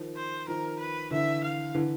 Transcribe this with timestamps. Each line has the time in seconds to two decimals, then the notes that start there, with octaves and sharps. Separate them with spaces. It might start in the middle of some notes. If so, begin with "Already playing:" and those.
Already playing: D#3 F3
0.17 C5
0.48 D#3 F3 A#4
0.79 B4
1.11 D3 E3 E5
1.43 F5
1.75 D3 E3